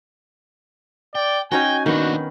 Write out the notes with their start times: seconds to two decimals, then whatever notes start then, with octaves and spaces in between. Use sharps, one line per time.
1.15 D5 G5
1.52 C#4 D#4 F#4 G5 G#5
1.86 D#2 D#3 B3 D4 F#4